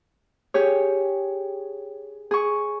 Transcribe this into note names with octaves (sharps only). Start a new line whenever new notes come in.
G4 G#4 C#5
G#4 C#6